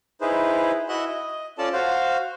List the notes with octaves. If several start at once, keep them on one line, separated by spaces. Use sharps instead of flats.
D#4 E4 G#4 B4 C5
E4 F#4 D#5 E5 F#5 F#6
D#5
C#4 F4 A4 D5 A5
F#4 C5 F5